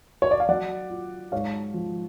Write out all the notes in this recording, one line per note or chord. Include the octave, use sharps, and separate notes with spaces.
C#5
D5
F5
F#3 D5 F#5
F4
G#2 C#5 F5
F3